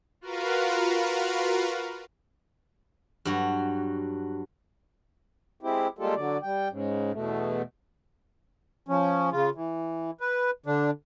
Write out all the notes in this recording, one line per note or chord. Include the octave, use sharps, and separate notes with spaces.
F4 F#4 A#4 B4 F5
G2 F#3 F#4
G#3 C4 E4 G4
G3 G#3 A#3 F4 G4 A4
D3 F#3 D5
G3 G5
G#2 C#3
E2 B2 A3
F3 C#4
C#3 F4
E3
B4
D3 D4